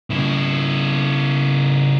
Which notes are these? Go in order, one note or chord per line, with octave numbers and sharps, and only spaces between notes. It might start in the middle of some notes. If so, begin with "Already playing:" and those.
C#3 E4